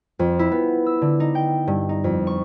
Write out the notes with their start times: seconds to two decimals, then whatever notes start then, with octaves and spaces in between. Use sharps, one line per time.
0.19 F2
0.39 E4
0.52 B3
0.86 E6
1.02 D3
1.20 D#4
1.35 G5
1.67 G2
1.89 D#4
2.04 F2
2.27 C#6